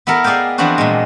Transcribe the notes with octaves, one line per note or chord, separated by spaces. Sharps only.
B3 E4 A4 A#4
G#4 D5 D#5 F5 G5
E3 F3 B3 C4 D4 F#4
A#2 G#3